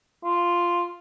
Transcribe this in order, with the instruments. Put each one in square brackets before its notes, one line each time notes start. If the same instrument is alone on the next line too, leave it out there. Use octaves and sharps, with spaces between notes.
[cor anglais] F4